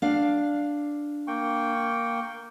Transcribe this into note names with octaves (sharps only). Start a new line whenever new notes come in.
D4 F5
A#3 G5 C#6